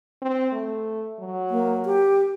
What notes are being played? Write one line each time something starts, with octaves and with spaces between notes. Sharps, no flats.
C4
A3
F#3
A#3
G4